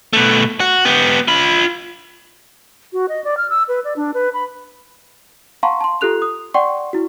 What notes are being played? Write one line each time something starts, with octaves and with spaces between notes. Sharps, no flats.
B2 A3
F#4
B3 G4
F4 B5
F#4
D#5
D5
F6
E6
B4
D5
D4
B4
B5
F5 F#5 A5 A#5 C6 C#6
A5 C6
F4 G4 A4 F#6 F7
D#6
D5 F#5 G5 C6 C#6
E4 F#4